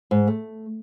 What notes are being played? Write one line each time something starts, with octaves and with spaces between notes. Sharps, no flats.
G#2
A3